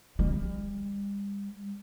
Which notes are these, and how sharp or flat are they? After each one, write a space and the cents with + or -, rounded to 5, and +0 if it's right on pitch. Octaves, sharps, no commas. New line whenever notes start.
G3 +40